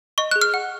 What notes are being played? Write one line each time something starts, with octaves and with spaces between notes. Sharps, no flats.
D#5 C#6
G#4 F#6
F6
F#5